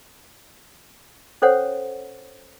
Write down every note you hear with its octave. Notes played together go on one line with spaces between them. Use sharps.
C#4 A4 C5 C#5 F#5